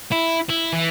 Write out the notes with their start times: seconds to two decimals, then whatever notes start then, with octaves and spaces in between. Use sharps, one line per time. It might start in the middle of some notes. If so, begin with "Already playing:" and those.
0.12 E4
0.49 E4
0.73 E3